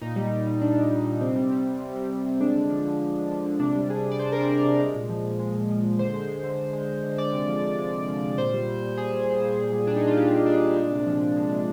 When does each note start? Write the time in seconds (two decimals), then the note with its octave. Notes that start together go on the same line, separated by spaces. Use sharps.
0.01 A#2 D#4
0.16 G3
0.31 G3
0.47 A#2
0.61 A#2 D4
0.76 G3
0.91 G3
1.06 A#2
1.21 C3 C4
1.36 G3
1.51 G3
1.66 C3
1.81 C3
1.96 G3
2.10 G3
2.26 C3
2.40 G#3 D4
2.55 D3
2.70 F3
2.85 D3
3.00 G#3
3.15 D3
3.30 F3
3.45 D3
3.60 C3 D4
3.75 G3
3.90 G3 G#4
4.05 C3
4.11 D5
4.19 C3 C5
4.32 G3 A#4
4.40 C5
4.49 G3
4.65 C3
4.80 G#3
4.95 A#2
5.09 F3
5.25 A#2
5.39 G#3
5.54 A#2
5.69 F3
5.83 A#2
5.99 D3 C5
6.14 G#3
6.28 G#3
6.43 D3
6.59 D3
6.73 G#3
6.88 G#3
7.03 D3
7.18 G#3 D5
7.33 C3
7.48 F3
7.63 C3
7.78 G#3
7.93 C3
8.08 F3
8.23 C3
8.38 A#2 C5
8.53 G3
8.68 G3
8.83 A#2
8.97 A#2 G#4
9.12 G3
9.27 G3
9.42 A#2
9.57 A#2
9.72 G3
9.87 G3 D4
9.96 D#4
10.01 A#2
10.07 F4
10.17 A#2 G4
10.32 G3
10.46 G3 D4
10.61 A#2
10.77 G#3
10.91 C3
11.06 F3
11.21 C3
11.36 G#3
11.51 C3